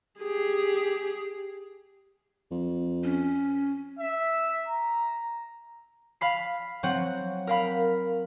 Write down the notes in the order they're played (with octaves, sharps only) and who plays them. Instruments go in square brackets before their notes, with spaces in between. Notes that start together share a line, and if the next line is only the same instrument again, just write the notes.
[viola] G4 G#4
[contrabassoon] F2
[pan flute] C#4
[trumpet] E5
A#5
[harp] F5 B5 C7
F#3 C4 F#5
A#4 F5 B5